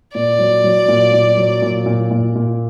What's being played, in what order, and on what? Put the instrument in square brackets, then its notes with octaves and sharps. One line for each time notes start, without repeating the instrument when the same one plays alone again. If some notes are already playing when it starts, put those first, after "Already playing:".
[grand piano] A#2 [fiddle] D5
[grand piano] F#3
F#3
A#2
A#2
F#3
A#2
A#2
A#2
A#2